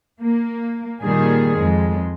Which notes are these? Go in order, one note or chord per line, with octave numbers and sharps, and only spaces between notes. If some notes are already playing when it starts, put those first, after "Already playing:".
A#3
A#2 D#3 G3 G#4
F2 G#3